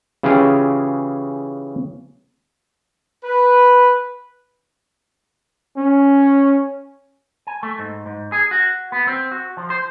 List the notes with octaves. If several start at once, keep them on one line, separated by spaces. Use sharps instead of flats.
C#3 E3 C#4 F4 G4 G#4
B4
C#4
G#5
A3
G#2
G#2
G#4
F#4
B3
C4
F#4
F3
C5